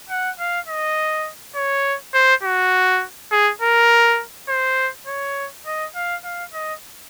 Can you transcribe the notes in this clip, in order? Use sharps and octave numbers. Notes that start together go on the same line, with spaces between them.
F#5
F5
D#5
C#5
C5
F#4
G#4
A#4
C5
C#5
D#5
F5
F5
D#5